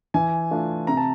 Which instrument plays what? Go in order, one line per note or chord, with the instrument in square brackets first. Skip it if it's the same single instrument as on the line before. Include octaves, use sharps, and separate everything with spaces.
[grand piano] E3 G#5
A3 D4 F4
C3 A#5
A5